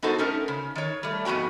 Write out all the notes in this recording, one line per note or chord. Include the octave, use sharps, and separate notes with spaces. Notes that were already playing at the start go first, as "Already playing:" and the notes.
B3 D#4 F#4 A4 C5
A3 C#4 D#4 A#4
C#3
D#3 C#5
G3 A3
F2 G#2 B3 F#4 G5